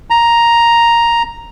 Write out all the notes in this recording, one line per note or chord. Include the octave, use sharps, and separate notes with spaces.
A#5